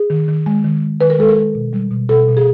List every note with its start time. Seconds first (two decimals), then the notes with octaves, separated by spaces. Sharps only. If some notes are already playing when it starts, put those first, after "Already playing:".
Already playing: G#4
0.10 D#3
0.28 D#3
0.46 G#3
0.64 D#3
0.82 G#3
1.01 D#3 B4
1.10 A#4
1.19 G#3 A4
1.29 A#4
1.37 G#3
1.55 B2
1.73 G3
1.91 B2
2.09 B2 A4
2.28 B2
2.37 G#4